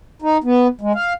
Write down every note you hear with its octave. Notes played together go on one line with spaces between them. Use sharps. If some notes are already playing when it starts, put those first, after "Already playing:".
D#4
B3
G#3
F5